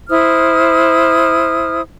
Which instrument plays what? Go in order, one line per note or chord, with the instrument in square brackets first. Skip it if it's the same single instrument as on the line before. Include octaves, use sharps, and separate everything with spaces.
[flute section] E4 C5 D#6 F6